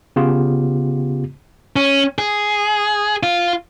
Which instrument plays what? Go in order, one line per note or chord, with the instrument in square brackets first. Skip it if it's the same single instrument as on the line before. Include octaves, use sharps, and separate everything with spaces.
[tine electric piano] C#3 B3 F4 G4
[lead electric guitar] C#4
G#4
F4